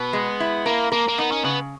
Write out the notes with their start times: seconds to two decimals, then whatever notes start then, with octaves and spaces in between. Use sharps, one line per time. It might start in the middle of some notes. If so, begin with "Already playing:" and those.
Already playing: B2 B3
0.13 G#3
0.40 E4
0.66 A#3 A#4
0.92 A#3 A#4
1.08 A#3
1.18 B3 D#4
1.32 C#4
1.44 C#3 B3